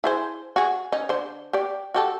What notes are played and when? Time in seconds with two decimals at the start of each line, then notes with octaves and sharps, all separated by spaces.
0.04 E4 G#4 C5
0.56 F#4 G#4
0.92 C#4 D#4
1.09 D3 C5
1.53 G4 D5
1.94 F#4 G4 A4